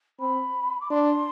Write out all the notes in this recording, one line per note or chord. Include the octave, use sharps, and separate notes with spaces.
C4 B5
D6
D4 C6